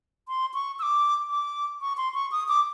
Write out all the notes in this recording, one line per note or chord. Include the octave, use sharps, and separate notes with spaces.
C6
C#6
E6
D6
D6
C#6
C6
C#6
D#6
D6